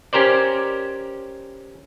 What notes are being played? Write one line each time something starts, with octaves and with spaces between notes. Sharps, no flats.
C#4 G4 A#4 C5 D5